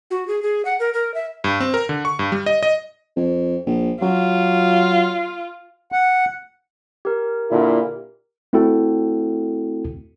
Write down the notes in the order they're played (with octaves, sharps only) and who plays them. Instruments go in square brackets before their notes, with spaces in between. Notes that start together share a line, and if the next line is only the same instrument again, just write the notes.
[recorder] F#4
G#4
G#4
F#5
A#4
A#4
E5
[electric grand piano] G2
C4
A#4
D3
C#6
G2
G3
D#5
D#5
[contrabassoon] F2
A#1
[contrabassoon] F#3 [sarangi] F4
[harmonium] F#5
[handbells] G4 A#4
[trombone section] A#2 D3 E4
[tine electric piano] A3 C4 E4 F#4 A4 G5